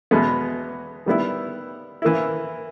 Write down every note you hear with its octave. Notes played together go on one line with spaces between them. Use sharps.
E2 B2 G#3 B3
D#3 G3 B3 E4
E3 A#3 E4